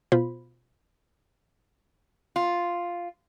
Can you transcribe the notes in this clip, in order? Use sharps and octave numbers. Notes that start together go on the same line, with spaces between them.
B2 F4 C5 B5
F4